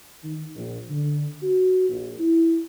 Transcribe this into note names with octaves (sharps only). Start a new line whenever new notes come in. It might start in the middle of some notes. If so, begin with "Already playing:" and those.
D#3
A#1
D3
F#4
A#1
E4